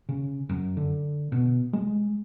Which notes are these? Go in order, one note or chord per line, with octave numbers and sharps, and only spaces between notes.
C#3
F#2
D3
B2
G#3